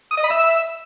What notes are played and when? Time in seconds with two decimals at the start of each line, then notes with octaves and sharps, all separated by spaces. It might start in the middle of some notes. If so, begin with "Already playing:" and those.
0.11 D#6
0.17 D#5
0.24 B5
0.30 E5